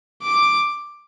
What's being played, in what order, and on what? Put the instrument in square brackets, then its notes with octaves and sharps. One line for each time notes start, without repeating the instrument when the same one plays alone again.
[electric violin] D6